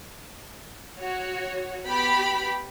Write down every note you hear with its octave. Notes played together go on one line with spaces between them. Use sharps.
F#4 C#5
B3 G4 B5